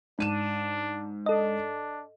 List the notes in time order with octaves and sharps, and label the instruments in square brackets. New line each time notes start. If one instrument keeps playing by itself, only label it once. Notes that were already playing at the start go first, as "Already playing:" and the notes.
[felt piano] G#2 D#7 E7 [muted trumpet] D4
[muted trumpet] D4 [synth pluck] A4 D#5